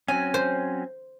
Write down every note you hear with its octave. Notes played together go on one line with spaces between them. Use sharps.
F#3 C4 C#4 G#5
C5